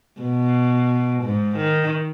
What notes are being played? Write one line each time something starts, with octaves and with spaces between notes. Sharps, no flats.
B2
G#2
D#3